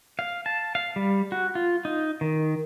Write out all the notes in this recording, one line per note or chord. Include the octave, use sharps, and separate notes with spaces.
F5
A5
F5
G3
F#4
F4
D#4
D#3